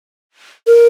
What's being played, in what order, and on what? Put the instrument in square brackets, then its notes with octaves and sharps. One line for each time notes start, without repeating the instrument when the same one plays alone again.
[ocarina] A#4